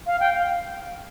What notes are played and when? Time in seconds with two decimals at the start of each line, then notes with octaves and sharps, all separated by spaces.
0.07 F5
0.20 G5
0.34 F5